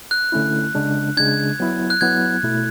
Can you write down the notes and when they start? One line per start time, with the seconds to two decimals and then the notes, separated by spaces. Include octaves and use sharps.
0.11 F#6
0.32 D3 A3 C#4 E4
0.75 C#3 G#3 D4
1.17 C#3 G#3 D4 G#6
1.60 F#3 B3 E4
1.90 F#6
2.01 F#3 B3 E4 G#6
2.43 B2 A3 E4